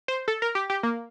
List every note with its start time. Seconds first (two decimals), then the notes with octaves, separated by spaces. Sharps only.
0.08 C5
0.28 A4
0.42 A#4
0.55 G4
0.70 G4
0.83 A#3